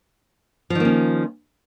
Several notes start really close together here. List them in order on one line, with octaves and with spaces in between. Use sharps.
F3 D#3 A#3 C#4